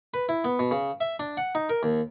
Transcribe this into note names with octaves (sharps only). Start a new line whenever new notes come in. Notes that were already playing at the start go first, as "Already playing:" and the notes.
B4
E4
B3
B2
C#3
E5
D4
F#5
D#4
A#4
D#2